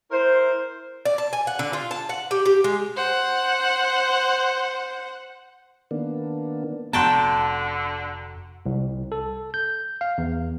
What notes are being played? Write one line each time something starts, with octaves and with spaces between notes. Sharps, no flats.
E4 A#4 C5
D5
A5
G#5
F#5
D3
F4
A5
F#5
G4
G4
G#3
C5 F#5
D#3 A#3 B3 D4
F1 D3 B3 F#4 G5 A5 A#5 C6
C2
A4
G6
F5
E2